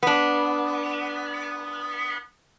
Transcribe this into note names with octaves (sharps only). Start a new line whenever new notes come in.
B3 D4